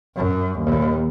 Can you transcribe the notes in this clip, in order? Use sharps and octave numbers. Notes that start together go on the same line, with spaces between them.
F#2
D#2